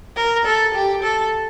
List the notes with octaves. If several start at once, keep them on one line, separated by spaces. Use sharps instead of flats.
A#4
A4
G4
A4